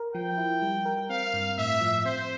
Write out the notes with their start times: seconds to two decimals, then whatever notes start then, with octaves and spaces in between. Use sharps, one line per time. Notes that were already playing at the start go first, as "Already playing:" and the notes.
Already playing: A#4
0.14 F3 G5
0.38 E4
0.62 G3
0.85 A#4
1.10 C4 F5
1.34 G2
1.58 A2 E5
1.81 F3
2.05 C4 C5